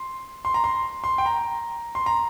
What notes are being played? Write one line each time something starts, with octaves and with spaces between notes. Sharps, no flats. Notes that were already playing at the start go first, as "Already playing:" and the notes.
Already playing: C6
C6
A#5
C6
C6
G5
A#5
C6
A#5